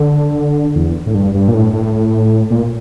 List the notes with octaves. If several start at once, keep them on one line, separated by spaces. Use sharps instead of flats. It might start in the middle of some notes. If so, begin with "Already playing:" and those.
Already playing: D3
E2
A2
G2
G2
A#2
A2
A2
A#2